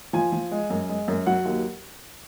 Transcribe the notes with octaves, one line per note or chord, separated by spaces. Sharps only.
F3 G#5
F3
G#3
F#2
G#3
F#2
F#3 F#5
D#2